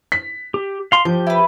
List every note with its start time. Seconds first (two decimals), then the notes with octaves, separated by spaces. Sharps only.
0.12 B6
0.54 G4
0.92 F5 C6
1.05 F3 G4 G6
1.27 E4 B4